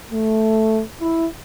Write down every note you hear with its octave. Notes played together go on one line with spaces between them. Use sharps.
A3
E4